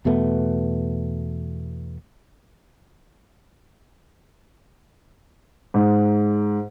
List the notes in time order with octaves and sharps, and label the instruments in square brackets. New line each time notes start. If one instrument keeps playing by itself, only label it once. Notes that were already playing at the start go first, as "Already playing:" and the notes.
[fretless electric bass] E2 B2 A3 B3
[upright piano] G#2